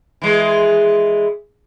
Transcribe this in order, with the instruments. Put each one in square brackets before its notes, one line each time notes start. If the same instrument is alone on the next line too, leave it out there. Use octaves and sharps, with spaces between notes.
[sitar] E3 G#3